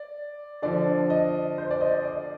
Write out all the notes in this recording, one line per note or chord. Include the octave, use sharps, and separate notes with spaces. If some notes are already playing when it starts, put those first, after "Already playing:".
Already playing: D5
D3 F3 D5
D#5
C5
D5
D#5
D5